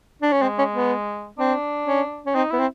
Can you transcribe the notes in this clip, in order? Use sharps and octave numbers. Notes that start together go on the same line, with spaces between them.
D4
C#4
G#3 C4
C#4
B3
C4 D4
C#4
C#4
C4 D#4
B3 E4
C4